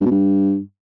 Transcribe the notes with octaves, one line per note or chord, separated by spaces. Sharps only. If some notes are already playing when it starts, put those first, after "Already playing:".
G2
B2
G2